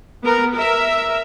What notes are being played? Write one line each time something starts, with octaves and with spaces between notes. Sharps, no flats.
B3 A#4
A#4 E5